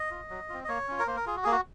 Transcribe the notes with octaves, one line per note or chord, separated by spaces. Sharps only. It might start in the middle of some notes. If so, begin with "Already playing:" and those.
Already playing: D#5
F4
F#3
C4 F4
D#5
A#3 C#5
C#4 F4
A#4
A#3 C5
A#4
F4 G#4
F#4
A#3 G#4
F#4